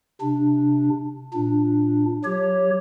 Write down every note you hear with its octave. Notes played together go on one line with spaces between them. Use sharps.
C3 D4
A#2 D4
F#3 G4 C#5